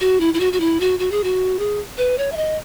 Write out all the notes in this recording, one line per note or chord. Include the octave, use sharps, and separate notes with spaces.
F#4
E4
E4
F#4
F#4
E4
F#4
F#4
G#4
F#4
G#4
B4
C#5
E5
D#5